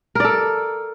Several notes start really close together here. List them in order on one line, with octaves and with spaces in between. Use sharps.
A#4 D5 A4